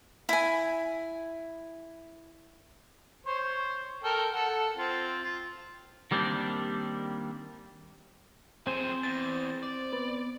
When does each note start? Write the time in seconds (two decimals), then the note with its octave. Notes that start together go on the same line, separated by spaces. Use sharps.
0.29 E4 G#5
3.26 C5 C#5
4.04 A4 A#4 G5
4.33 A4 F#5
4.77 C4 F4
5.24 F4
6.11 D#3 G3 A#3 C4 D4
8.67 F3 C4 G#4 C5
9.03 E2 A6
9.63 D5
9.93 B3